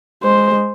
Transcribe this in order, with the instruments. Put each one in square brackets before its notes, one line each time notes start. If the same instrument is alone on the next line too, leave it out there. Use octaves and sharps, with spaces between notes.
[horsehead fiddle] G#3 [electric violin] C5